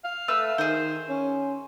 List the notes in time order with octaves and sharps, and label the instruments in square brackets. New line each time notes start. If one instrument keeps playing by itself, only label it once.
[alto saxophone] F5
[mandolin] A3 B4 E6
[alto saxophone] D#3 [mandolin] G#4 C5
[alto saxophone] C#4